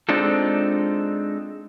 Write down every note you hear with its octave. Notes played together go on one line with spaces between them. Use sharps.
G#3 C4 D4 D#4 F4 A4